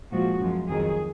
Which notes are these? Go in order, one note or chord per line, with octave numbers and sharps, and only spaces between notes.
A#2 F3 G#3 F#4
F#2 F3 G#3
F2 D#3 F#3 G#4